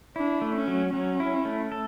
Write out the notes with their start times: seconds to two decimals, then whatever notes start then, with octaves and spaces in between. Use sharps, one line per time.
0.16 D4 E4
0.42 A3
0.56 C#4
0.68 F#3
0.93 F#3 C#4
1.20 E4
1.45 A3
1.72 A4